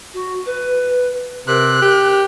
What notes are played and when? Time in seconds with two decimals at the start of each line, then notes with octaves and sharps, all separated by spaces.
0.13 F#4
0.45 B4
1.47 C3 A#4 F#6
1.82 G4